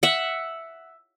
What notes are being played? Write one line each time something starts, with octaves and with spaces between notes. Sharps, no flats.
E5 F#5